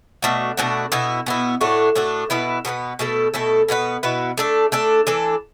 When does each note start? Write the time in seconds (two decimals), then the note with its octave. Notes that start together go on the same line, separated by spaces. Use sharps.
0.22 B2 A3 D4 F#4
0.57 B2 A3 D4 F#4
0.92 B2 B3 E4
1.26 B2 B3 E4
1.61 A2 A3 D4 F#4
1.95 A2 A3 D4 F#4
2.30 B2 B3 E4 B4
2.65 B2 B3 E4 B4
2.99 B2 A3 E4 A4
3.34 B2 A3 E4 A4
3.68 B2 B3 E4 B4
4.03 B2 B3 E4 B4
4.38 A3 D4 A4
4.72 A3 D4 A4
5.07 E3 D4 A4